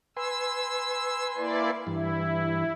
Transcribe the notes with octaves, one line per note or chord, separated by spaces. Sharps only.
B4 G#5 C6 E6
A#3 E4 D5
G2 E3 E4